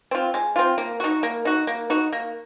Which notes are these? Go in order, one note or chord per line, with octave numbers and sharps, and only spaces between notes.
C4 F4
G#3
C4 F4
A#3
D#4 F#4
A#3
D#4 F#4
A#3
D#4 F#4
A#3